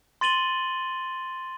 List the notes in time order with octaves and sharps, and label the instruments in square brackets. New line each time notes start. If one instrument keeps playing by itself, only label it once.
[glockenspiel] C6 A6 D#7 F#7 G7